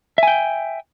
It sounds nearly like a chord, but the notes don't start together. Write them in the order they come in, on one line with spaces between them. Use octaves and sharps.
E5 G#5 G5